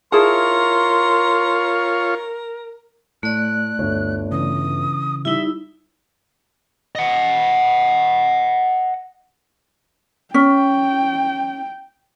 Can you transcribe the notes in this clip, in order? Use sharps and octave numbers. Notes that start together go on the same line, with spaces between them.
E4 F4 G#4 A#4 C#5 A5 C6
A2 A3 D5 F#6
G1 D2 C#5
C#3 E3 D#6
G3 D#4 E4 E5
D#5 F#5
C#4 G5